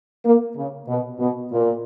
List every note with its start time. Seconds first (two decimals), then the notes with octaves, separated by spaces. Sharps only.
0.25 A#3
0.56 C#3
0.88 B2
1.19 B2
1.52 A#2